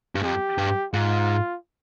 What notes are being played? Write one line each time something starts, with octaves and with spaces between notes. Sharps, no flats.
G2
F2 G4
G2
G#2 F4